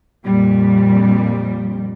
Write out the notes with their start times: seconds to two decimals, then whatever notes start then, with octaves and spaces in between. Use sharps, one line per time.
0.24 F2 A#2 G3